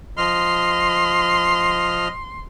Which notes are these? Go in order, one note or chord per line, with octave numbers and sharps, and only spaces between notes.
F3 D#5 C6 F6